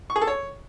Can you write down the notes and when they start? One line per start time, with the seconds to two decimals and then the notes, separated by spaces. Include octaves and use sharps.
0.10 C#6
0.16 G#4
0.22 A4
0.27 C#5